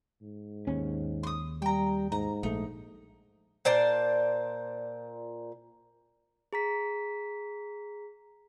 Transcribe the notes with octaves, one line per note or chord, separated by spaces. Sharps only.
G#2
D#2 C#4
C6 D#6
G3 G5 A#5
G#2 A#5
A#1 A3 D#4
A#2 C5 D5 A5
G#4 A#5 B6